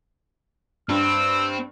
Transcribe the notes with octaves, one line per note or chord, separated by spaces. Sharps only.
G2 C4 E6